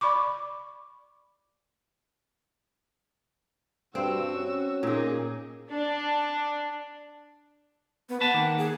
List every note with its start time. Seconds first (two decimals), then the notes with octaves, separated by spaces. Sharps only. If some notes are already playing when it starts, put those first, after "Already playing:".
0.01 D5 B5 C#6 D6
3.95 G2 C4 F#4 E6
4.35 C#4
4.83 A#2 A#3 D#4 G#4
5.70 D4
8.09 B3
8.21 B4 F#5 A5
8.34 D#3 A#3
8.58 G#4